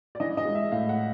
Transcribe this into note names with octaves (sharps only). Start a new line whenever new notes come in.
D5
E3 D#5
D#5
G#3
E5
A2 F5
F#5